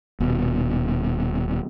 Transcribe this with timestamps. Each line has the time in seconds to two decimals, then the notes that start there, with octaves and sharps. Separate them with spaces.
0.20 D#1 B2